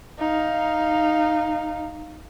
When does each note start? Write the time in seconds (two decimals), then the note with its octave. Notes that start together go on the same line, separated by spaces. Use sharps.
0.19 D#4 F5